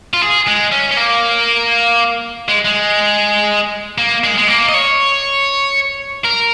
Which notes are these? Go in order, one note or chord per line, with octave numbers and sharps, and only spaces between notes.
F4
G#4
G#3
C#4
C#4
A#3
G#3
G#3
A#3
G#3
G#3
A#3
D#5
C#5
A#4